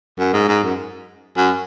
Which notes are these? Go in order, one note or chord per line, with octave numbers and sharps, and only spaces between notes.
F#2
G#2
G#2
F#2
F#2